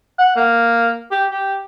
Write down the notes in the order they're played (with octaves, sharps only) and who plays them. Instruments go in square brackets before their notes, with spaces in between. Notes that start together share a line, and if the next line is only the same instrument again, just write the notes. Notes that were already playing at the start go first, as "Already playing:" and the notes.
[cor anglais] F#5
A#3
G4
G4